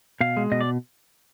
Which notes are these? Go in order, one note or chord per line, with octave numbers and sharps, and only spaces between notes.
B2 F5
G#3
B2 D#5
D5